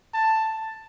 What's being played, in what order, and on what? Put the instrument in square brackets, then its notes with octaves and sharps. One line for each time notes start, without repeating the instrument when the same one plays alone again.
[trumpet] A5